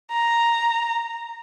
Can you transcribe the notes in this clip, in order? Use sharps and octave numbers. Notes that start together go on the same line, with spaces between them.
A#5